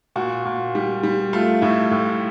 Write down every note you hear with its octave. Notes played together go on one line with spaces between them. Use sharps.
A#2 F#4
A#2
G3
G3
A3 F4
A2 E4
A2